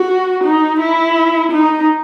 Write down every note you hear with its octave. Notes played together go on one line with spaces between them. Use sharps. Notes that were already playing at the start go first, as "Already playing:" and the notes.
Already playing: F#4
D#4
E4
D#4